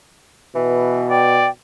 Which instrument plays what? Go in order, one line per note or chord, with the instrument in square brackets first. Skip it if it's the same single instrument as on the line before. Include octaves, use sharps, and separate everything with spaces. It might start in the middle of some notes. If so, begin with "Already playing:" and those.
[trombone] B2 [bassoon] E3
[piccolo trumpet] D5 [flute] G5